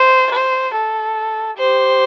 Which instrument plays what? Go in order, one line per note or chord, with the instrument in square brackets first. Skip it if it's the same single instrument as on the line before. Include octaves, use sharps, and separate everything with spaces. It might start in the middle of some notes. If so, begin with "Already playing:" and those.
Already playing: [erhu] C5
C5
A4
[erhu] G4 [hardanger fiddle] C5